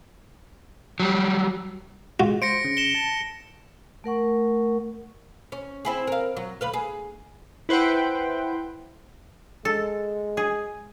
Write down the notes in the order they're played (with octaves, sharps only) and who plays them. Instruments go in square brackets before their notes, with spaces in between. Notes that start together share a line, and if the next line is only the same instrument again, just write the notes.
[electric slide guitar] F#3 G3
[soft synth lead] G#3 [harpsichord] F4 F#4
[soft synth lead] C5 [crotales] A#6 C#7 D7
[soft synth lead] C#3
[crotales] E7 G7
[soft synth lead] A5
[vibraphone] A3 A#4 F#5 C#6
[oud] C#4
C4 E4 G#4
A#4 F5
F#3
D2 B4 F5
G#4
[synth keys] E4 B4 C5 F#5 G5
[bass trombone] G#3 [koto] A4
[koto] G#4